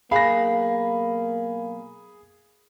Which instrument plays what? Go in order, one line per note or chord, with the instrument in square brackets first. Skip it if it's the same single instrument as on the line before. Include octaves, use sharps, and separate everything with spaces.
[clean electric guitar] B1 F5 [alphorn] A#3 [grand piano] G#4 [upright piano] B5 A#6